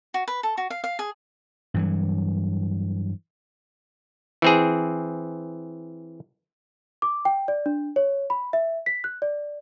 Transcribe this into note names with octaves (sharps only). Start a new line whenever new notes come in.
F#4
B4
A4
F#4
F5
F5
G#4
G2 E3 F#3
E3 C4 G#4
D6
G5
D5
D4
C#5
B5
E5
B6
F#6
D5